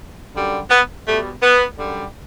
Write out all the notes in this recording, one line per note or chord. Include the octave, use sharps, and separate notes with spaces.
F#2 D3 G3
B3
B2 G3 A3
B3
F#2 D3 G3